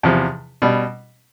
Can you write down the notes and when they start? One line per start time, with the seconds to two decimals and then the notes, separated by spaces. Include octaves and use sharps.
0.03 E2 C3 F3
0.62 B2 G3